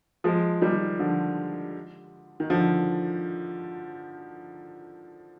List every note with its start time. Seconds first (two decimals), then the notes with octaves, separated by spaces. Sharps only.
0.24 F3 G#3
0.62 D#3 G3
0.99 D3 F3
2.40 D#3
2.50 D3 F3